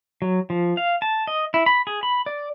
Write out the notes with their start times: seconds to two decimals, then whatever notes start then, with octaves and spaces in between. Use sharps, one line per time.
0.22 F#3
0.50 F3
0.77 F5
1.02 A5
1.27 D#5
1.54 E4
1.66 B5
1.87 G#4
2.03 B5
2.26 D5